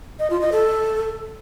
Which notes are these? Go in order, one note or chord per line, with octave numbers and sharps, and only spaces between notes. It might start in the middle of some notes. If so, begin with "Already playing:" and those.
D#5
F4
D#5
A4